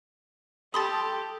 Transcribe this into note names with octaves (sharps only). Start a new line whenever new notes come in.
G4 A4 A5 B5 C6 D#6 A6